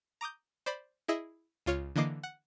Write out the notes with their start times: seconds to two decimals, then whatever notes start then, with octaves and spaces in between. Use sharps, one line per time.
0.21 A#5 D6 D#6 G6
0.66 C5 D5 B5
1.08 E4 G#4 D#5 E5
1.66 C#2 F4 C#5 F6
1.96 D3 E3 A#3 D#5 D6 C7
2.23 F#5